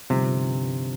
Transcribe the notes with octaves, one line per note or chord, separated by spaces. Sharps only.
G1 G2 C3 F3 C4 D#4